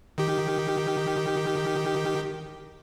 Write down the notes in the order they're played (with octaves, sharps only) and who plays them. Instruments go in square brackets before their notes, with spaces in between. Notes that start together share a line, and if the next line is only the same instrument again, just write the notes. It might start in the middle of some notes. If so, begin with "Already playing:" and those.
[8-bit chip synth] D#3 G4